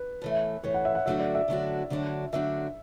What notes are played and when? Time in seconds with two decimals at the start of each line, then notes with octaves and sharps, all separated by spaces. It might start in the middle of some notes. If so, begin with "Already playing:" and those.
Already playing: B4
0.22 A2 E3 A3
0.63 A2 E3 A3 C#5
0.74 F#5
0.85 E5
0.95 F#5
1.06 D3 F#3 A3 D4 F#4 E5
1.20 D5
1.35 E5
1.48 D3 F#3 A3 D4 F#4
1.90 D3 F#3 A3 D4 F#4
2.33 D3 F#3 A3 D4 F#4 E5